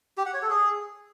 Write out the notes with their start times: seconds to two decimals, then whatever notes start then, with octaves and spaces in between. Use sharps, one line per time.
0.18 G4
0.26 F#5
0.34 C#5
0.42 A4
0.50 G#4